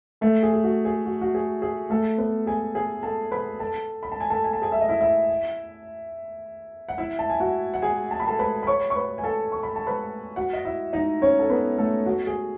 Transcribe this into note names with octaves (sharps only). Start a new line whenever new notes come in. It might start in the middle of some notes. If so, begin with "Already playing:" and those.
A3 A4
G#4
G#4
F#4
G#4
F#4
F#4
G#4
G#4
A3 A4
B3 B4
G#4 G#5
G#4 G#5
A4 A5
B4 B5
A4 A5
B5
A5
G#5
A4 A5
G#5
A5
G#4 G#5
E5
D#5
E4 E5
E4 E5
F#5
E4 E5
A5
G#5
F#4 F#5
F#5
G#4 G#5
A5
B5
A4 A5
B4 B5
B5
C#5 C#6
C#6
B4 B5
G#5
A4 A5
C#6
B5
A5
B4 B5
F#4 F#5
D#5
E4 E5
D#4 D#5
C#4 C#5
A4
B3 B4
A3 A4
F#4
G#4